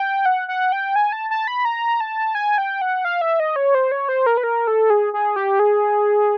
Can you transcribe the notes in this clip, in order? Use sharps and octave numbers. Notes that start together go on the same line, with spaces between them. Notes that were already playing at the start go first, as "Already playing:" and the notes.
Already playing: G5
F#5
F#5
G5
G#5
A5
A5
B5
A#5
A5
G#5
G5
F#5
F5
E5
D#5
C#5
C5
C#5
C5
A#4
B4
A#4
A4
G#4
G#4
G4
G#4